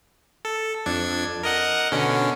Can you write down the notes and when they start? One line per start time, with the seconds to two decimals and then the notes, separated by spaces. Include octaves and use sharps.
0.45 A4
0.86 F2 D4 G#6
1.44 A#4 D#5 F#5
1.92 B2 D3 C#4